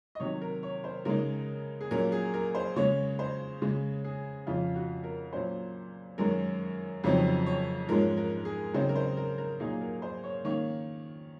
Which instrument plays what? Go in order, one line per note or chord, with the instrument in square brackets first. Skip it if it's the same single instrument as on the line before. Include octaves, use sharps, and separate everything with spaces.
[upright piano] D#5
C3 D#3 F#3 C#5
A#4
C#5
C5
C#3 G#3 D#4 A#4
G#4
A#2 F#3 C#4 A#4
G#4
A#4
C5
C#3 G#3 C#4 C#5
C5
C#3 G#3 C#4
G#4
F2 C#3 F3 F4
F#4
A#4
A#2 F#3 C#4 C5
F#2 D#3 G#3 C#4 A#4
F2 C#3 F#3 C4 D#4
C#5
G#2 F3 G#3 C#4 A#4
A#4
G#4
C#3 F#3 C4 D#4 C5
A#4
C5
A#4
A#4
A#2 F#3 A#3 D#4 G#4
A#4
C5
C#5
D#3 A#3 C#4 C#5